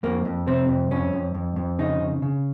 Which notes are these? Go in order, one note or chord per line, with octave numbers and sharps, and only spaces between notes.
F2 A#3
F2
C3 C4
F2
F2 C#4
F2
F2
F2
C#3 D#4
C#3
C#3